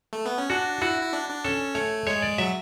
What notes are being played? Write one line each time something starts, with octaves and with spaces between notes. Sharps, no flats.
A3
B3
C#4
D4 F#4
E4 F#4
E4
D4
D4
C#4 A4
A3 C#5
G#3 C#5
D5
F#3 E5